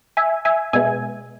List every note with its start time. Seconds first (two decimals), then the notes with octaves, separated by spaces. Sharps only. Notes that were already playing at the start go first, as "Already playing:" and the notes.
0.17 E5 G#5
0.45 E5 G#5
0.73 B2 G#3 B3 E5 G#5